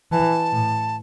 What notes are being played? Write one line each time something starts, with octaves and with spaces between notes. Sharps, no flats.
E3 A5
A2